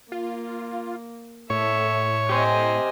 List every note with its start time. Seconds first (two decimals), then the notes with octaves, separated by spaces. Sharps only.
0.12 A#3 F4
1.50 A2 A4 C#5 E5
2.29 G4 C5 D#5 G#5